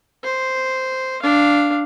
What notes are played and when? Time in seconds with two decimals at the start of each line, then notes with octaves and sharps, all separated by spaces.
0.24 C5
1.22 D4 F5